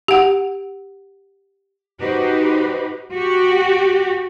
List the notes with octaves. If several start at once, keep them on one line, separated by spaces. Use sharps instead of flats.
G4 F#5
D#4 F#4 G4 B4 C5
F#4 G4